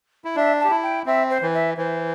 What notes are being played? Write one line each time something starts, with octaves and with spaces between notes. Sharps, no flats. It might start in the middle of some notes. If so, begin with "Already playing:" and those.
E4
D4 E5
A5
G4
E4
G5
C4 E5
C5
E3
E5
E3 C5